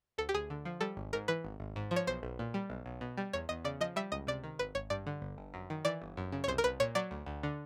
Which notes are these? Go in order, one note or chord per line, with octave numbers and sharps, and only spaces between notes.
D2 A4
G4
D2 G#4
D3
F3
G3 A4
G#1
G#2 A#4
E3 B4
G#1
G#1
G#2
F3
C#5
B1 C5
B1
A#2
G3
B1
B1
B2
G3
E2 C#5
E2 D#5
C#3 D5
F3 D#5
G3 E5
C#2 D#5
C3 D5
D#3
G#1 B4
G#1 C#5
G2 D5
D3
G1
G1
F#2
D#3
E3 D5
G1
F#2
C#3
C#5
C2 C5
A#4
C2 B4
A#2 C#5
F#3 D5
D2
D2
D3